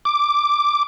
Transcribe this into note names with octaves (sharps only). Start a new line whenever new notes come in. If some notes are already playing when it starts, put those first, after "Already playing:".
D6